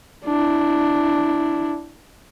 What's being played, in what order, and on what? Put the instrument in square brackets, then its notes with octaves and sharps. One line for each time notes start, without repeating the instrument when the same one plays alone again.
[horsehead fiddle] D4 E4